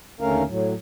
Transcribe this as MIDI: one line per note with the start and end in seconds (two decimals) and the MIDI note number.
0.21 0.43 39
0.21 0.43 50
0.21 0.43 57
0.21 0.43 61
0.21 0.43 70
0.21 0.43 77
0.47 0.74 45
0.47 0.74 54